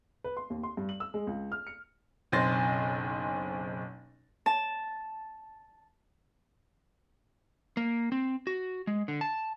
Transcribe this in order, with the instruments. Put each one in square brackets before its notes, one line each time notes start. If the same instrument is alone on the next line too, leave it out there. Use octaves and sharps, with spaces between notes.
[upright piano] B4
C6
D#2
C6
G2
F#7
E6
G#3
C#2
F6
C#7
F#1 B1 C4 C6 A6 A#6
[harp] A5
[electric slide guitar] A#3
C4
F#4
G#3
D3
A5